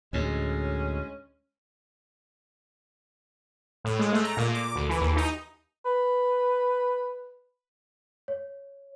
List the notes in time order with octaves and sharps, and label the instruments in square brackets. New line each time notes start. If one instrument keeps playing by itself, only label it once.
[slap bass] D2 A2 [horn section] G#3 C#4
[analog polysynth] A2
G#3
A3
A#5
A#2
D6
D2
E3
D#2
D#4
[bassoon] B4
[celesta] C#5